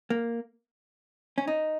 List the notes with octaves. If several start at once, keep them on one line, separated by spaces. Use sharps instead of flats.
A#3
C#4
D#4